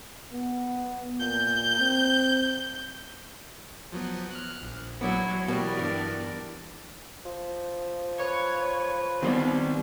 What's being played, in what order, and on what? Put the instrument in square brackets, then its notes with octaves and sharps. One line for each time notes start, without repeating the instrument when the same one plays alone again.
[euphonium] B3
[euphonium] A#2 [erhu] G6
[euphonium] C4
[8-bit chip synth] F3 F#3 B3
F6 F#6
A#1
[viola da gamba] F#3 [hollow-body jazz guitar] B3 D4 E4
[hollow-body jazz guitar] B2 G3 [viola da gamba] E3 A#4 D5 [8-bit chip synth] B3
[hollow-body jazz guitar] G2 D4
[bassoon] F3
[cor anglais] B4 [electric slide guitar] C#5
[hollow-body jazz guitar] D#3 G3 B3 [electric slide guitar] C4 C5 D5